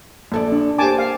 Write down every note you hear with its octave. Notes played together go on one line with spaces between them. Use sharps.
A#1 A4 D5
D4
A#3 G4 C5 G#5 A5 D6
F5